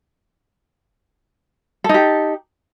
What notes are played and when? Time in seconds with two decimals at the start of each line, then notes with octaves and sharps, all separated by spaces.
1.84 A4
1.89 D#4
1.94 G4